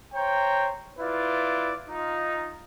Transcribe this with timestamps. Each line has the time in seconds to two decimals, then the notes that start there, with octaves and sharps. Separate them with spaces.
0.14 C5 C#5 G5 A#5
0.99 E4 F4 B4 D5
1.88 D#4 F4